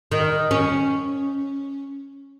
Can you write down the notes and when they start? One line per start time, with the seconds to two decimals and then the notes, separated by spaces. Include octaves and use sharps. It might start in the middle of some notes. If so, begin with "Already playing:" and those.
0.12 D#3
0.51 C#4